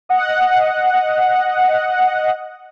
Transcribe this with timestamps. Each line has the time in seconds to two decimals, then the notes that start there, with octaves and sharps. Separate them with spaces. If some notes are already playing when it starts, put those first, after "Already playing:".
0.09 D#5 F#5